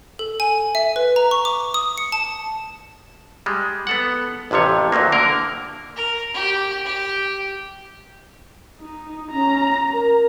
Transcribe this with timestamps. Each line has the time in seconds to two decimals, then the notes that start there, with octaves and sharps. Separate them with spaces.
0.19 A4
0.40 G#5
0.75 E5
0.96 B4
1.16 A#5
1.31 C#6
1.45 D6
1.74 D#6
1.98 C#7
2.12 A5
3.46 G3 G#3
3.87 B3 A4 F#5
4.51 A1 F2 C3 F3 C#5
4.92 D2 F3 F#3 A#3
5.12 D3 A#3 A#4
5.96 A#4
6.34 G4
6.85 G4
8.81 D#4
9.32 C#4 A#5
9.94 A#4